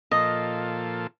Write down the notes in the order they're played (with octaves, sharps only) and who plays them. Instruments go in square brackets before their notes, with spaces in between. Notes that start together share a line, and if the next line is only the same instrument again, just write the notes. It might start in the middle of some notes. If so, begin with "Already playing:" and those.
[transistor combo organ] A#2 F3 A4 [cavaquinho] D#5